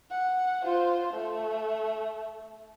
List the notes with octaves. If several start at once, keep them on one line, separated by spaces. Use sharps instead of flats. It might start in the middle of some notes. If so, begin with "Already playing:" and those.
F#5
F4 C5
A3